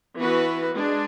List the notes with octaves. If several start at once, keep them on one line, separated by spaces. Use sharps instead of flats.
E3 B3 F#4 B4
G#3 D4